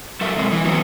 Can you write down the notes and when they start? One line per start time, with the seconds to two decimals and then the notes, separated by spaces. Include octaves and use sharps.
0.21 F#3 A4 A#4 E5
0.36 B2 G#3 C4
0.51 E3
0.65 F#3 B3 C#4